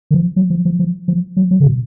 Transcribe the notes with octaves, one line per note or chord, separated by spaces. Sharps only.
D#3
F3
F#3
F3
F3
F3
F3
F#3
F#3
C#3
B2